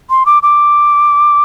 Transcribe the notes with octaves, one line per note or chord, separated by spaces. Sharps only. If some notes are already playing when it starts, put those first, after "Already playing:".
C6
D6
D6